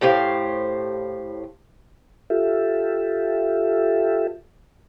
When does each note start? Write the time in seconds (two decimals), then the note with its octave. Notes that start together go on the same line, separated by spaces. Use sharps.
0.01 A2 G4 C5 F5
2.30 F4 G4 A4 E5